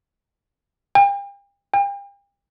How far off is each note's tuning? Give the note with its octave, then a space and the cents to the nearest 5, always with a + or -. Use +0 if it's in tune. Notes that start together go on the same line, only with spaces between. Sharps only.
G5 +40
G5 +40